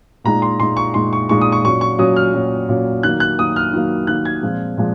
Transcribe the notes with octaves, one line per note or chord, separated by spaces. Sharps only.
A#2 G#3 D#4 A#5
C6
A#2 G#3 D#4 C6
C#6
A#2 G#3 D#4 C6
C#6
A#2 G#3 D#4 C#6
D#6
C#6
A#2 F#3 C#4 C#6
C#6
A#2 F#3 C#4 D#6
F6
A#2 F#3 C#4
A#2 F#3 C#4
D#3 F#3 A#3 F#6
F#6
D#3 F#3 A#3 D#6
F6
D#3 F#3 A#3
D#3 F#3 A#3 F#6
G#6
A#2 F3 G#3 C4
A#2 F3 G#3